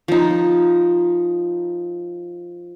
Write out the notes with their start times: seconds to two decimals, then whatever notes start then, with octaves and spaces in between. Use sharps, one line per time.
0.08 F3 D#4